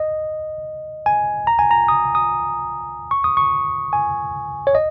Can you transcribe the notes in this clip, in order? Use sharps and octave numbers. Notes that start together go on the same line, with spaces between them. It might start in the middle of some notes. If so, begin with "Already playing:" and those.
Already playing: D#5
G#5
A#5
G#5
A#5
D#6
D#6
C#6
D#6
C#6
G#5
C#5
D#5